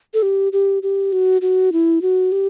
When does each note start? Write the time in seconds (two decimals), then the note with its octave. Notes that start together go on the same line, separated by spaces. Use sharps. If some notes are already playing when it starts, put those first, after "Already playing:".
0.14 A4
0.23 G4
0.53 G4
0.83 G4
1.12 F#4
1.42 F#4
1.73 E4
2.02 F#4
2.32 G4